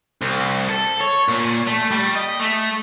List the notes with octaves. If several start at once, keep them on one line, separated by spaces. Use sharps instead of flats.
C2
A4
C#5
A#2
A3
G3
D#5
A3